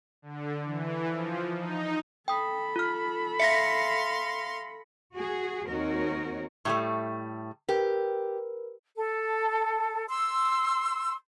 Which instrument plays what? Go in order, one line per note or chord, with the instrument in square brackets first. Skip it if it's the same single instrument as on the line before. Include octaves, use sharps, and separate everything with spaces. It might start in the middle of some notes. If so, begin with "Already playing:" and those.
[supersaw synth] D3
E3
F3
D#4
[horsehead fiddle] A4 B5 [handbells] G5 D#6
[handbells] F4 F6
[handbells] E5 [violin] F5 C6 [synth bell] A#6 B6 C#7
[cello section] F#4 G#4
D#2 C4 D#4 F#4 A#4 C#5
[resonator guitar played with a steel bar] A2 G3 A3
[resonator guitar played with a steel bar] G4 [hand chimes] A#4 B4
[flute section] A4
C6 E6